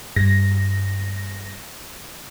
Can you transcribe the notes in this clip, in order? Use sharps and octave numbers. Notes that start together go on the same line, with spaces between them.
G2 A#6